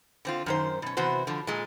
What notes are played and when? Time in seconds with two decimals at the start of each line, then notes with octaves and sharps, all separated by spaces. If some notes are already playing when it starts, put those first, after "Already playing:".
0.25 D3 C4 F4
0.46 F#2 D#3 C5
0.82 B2 C#4
0.97 C3 E3 B3 F#4 C5
1.27 D3 F3
1.47 A#2 G#3